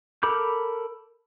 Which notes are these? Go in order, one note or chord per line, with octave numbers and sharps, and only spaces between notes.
A4 A#4 B5 D6 G6